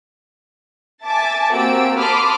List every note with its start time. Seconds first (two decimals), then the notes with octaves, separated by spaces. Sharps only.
1.05 E5 G#5 A5 D6 A6
1.52 A#3 C4 F#4 G4 E6 D7
1.98 A5 B5 C6 D6 D#6 F6